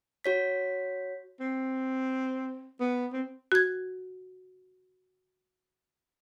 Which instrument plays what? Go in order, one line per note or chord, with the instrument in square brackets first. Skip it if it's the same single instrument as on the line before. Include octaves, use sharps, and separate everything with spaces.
[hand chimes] F#4 C#5 B6
[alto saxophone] C4
B3
C4
[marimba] F#4 G#6